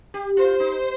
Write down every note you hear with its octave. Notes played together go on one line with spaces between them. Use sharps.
G4
F4 C5
D#4